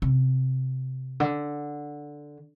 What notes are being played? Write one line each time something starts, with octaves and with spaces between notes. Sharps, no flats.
C3
D3